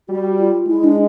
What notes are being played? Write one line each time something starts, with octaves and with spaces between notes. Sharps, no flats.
G3 F#4
F4
G#3 E4
D4